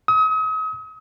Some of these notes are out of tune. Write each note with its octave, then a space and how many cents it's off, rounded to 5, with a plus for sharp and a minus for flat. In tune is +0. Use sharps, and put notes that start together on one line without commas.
D#6 +40